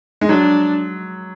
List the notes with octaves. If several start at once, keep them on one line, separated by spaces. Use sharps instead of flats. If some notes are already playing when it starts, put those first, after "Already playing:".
G#3
F#3 D4